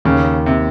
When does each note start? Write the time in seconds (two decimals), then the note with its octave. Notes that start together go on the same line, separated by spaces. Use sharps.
0.05 D#2 C#3
0.46 C3